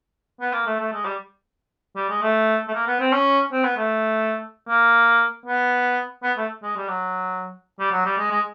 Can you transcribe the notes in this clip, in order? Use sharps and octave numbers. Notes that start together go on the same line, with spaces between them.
B3
A#3
A3
A3
G#3
G3
G3
G#3
A3
A3
A#3
B3
C4
C#4
C4
B3
A3
A#3
B3
B3
A3
G#3
G3
F#3
G3
F#3
G3
G#3
G#3